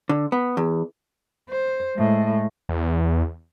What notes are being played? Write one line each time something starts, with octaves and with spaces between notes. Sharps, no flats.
D3
B3
E2
C5
A2 G#3
E2